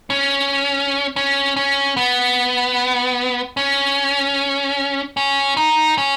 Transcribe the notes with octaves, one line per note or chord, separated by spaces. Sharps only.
C#4
C#4
C#4
B3
C#4
C#4
D#4
C#4